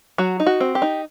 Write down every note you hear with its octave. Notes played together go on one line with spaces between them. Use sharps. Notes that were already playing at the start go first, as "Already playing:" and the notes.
F#3 F#4
D#4
F#4
C4
G4
D#4